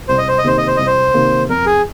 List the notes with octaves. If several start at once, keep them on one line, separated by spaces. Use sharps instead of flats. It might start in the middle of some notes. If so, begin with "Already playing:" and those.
C2 C5
D#5
C5
D#5
C3 D#3 A#3 C5
D#5
C5
C2 D#5
C5
C3 D#3 A#3
F2 A#4
G#4